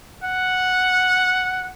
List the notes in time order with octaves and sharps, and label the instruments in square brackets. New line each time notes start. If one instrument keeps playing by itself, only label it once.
[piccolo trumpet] F#5